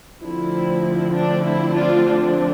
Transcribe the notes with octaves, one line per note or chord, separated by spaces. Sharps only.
D3 F3 A3 C4 E4
D4
E4
D4 F4
D4